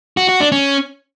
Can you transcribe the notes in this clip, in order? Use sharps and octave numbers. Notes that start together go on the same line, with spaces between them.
F#4
F#4
D4
C#4